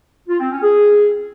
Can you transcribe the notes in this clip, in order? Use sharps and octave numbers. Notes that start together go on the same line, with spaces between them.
F4
C4
C#4
G#4